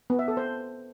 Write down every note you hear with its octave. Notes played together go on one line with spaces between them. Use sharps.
B3
E5
A4
C5